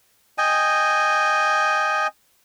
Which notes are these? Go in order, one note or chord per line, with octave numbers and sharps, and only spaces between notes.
D#5 G5 G#5